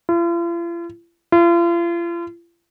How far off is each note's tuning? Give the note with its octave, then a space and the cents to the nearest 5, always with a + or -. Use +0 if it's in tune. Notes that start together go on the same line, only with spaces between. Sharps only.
F4 -45
F4 -40